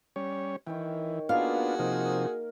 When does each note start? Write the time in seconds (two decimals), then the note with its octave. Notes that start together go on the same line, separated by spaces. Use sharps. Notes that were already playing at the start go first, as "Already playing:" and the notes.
0.16 G3 C#4 C#5
0.67 D#3 E3 C#5 G5
1.29 A#3 B3 D4 F4 F#4 G#4 F5 A#5
1.79 C3 F3 D#4 A#4